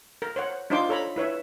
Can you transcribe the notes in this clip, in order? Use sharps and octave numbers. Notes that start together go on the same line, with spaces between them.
A#4
C5 C#5 F#5
D4 D#4 F4 C5 C6 D6
A4 C#5 A#5 B5
E4 B4 C#5 E5